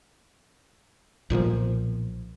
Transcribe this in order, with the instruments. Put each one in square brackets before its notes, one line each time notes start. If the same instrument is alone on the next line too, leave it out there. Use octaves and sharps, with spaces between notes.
[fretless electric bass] B1 A#2 D3 F3